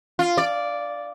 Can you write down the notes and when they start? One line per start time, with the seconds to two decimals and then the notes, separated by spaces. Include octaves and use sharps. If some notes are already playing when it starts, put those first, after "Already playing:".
0.19 F4
0.37 D5